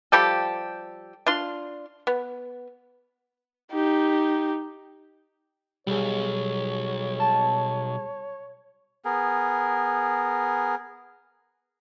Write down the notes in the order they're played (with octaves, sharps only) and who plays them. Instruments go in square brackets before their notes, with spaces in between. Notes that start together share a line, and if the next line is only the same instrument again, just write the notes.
[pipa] F3 G3 G4 A4
D4 F4 C6
B3
[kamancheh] D#4 G4
[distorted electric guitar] B1 [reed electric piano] G3 G#4 [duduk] C#5
[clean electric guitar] A5
[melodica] B3 G#4 A#4